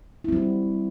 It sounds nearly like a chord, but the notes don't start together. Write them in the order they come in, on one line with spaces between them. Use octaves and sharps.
E4 C4 G3 F#4